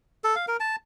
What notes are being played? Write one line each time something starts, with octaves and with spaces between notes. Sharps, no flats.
A4
F5
A#4
A5